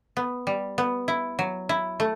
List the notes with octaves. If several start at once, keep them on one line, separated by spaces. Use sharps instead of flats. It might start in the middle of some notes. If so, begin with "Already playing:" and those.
B3
G3
B3
E4
F#3
E4
A3